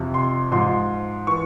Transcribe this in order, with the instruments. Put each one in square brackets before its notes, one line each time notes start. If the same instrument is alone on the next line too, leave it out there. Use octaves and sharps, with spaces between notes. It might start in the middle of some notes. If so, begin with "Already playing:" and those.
Already playing: [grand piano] F2 C3 F3
C6
G#2 F3 C6
E3 C#6